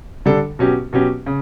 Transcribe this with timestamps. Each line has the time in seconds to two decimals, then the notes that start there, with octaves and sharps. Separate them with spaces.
0.26 D3 G3 D4 A4
0.59 B2 F#3 C#4 G4
0.93 B2 F#3 C#4 G4
1.26 C#3